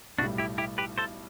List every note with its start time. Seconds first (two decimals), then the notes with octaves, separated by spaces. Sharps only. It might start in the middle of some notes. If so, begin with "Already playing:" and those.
0.18 B1 A2 G3 D4 F#4
0.38 E4 G4
0.58 E4 G4
0.78 G4 B4
0.98 A4 C5